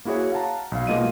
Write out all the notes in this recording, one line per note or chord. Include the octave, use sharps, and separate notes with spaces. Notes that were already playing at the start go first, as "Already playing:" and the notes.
A#3 E4 F#4 G#4 C#5
F5 F#5 A5 A#5
B1 F5
B2 G#3 A#3 F4 D#5 D#7